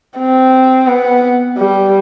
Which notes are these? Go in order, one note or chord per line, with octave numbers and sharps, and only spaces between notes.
C4
B3
G3